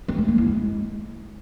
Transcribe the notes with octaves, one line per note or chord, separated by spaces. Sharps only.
C4
A3
A#3
E4
G#3